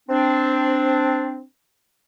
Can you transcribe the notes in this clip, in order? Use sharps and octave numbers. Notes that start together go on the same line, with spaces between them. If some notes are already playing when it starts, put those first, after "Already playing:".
C4 D4